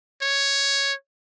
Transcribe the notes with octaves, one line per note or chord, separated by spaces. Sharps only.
C#5